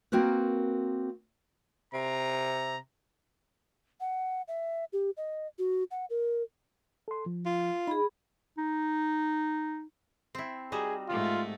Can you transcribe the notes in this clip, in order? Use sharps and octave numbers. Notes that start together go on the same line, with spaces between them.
A#3 C4 F#4 A#4 B4
C3 A#5
F#5
E5
G4
D#5
F#4
F#5
A#4
A4 C6
F3
F4
D#4 G#4 B5
D#4
C4 E4
G3 D#4 F#4 G#4
G#2 A3 F4